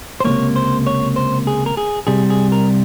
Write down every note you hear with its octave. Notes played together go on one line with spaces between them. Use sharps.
C5
C#2 C3 D#3 A#3 C#5
C5
C#5
C5
G#4
A#4
G#4
C2 C3 G3 G#4
G#4
A#4